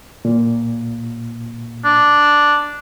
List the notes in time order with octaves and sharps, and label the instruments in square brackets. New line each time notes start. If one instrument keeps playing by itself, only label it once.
[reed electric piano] A#2
[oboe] D4